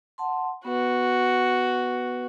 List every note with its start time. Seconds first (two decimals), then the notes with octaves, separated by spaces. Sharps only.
0.18 F#5 A5 C6
0.65 B3 F#4 B4